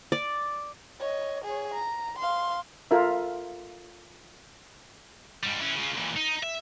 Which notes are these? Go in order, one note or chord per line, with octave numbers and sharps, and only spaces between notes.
D5
C#5 D#5
G#4 C#5
A#5
F5 C6
F4 A4 A#4 E5
G#2 G3
E3 C#4
C#3 F4
A#2 E3
D#4
E5